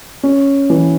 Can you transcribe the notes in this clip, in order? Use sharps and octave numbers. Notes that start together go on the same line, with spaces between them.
C#4
E3